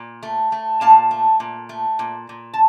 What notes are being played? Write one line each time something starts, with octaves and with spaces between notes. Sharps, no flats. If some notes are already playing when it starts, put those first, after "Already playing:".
Already playing: A#2
A3
A3
A#2 F5 A5
A3
A#2
A3
A#2
A#2
A5